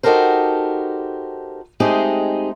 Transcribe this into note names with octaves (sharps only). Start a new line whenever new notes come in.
D#4 F#4 G4 A4 A#4 C5
G#3 A3 C4 D#4 G4 G#4